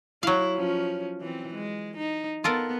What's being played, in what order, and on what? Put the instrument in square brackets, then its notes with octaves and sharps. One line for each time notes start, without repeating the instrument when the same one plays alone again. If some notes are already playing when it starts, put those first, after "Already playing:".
[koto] F#3 F5 [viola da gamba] E4
[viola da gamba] F3 C#4
E3 C4
G#3
D#4
[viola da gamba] B3 [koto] F4 A4 A#4